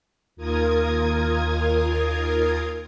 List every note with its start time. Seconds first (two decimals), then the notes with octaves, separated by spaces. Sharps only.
0.36 D#2 F4 A#4 D#6 G#6